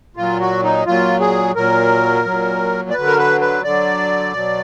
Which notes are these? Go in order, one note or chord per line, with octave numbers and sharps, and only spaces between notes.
A#2 F#3 F4
F#4
D#4
A#2 F#3 F4
G#4
A#2 F#3 A#4
A#2 F#3
D5
D3 F#3 B4
A#4
B4
B4
D3 F#3 D5
B2 F#3